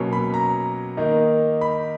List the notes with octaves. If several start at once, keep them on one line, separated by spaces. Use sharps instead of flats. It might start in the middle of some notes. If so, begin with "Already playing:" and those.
Already playing: B2 F#3 A#3 C#4
B5
A#5
D#3 A#3 D#4
B5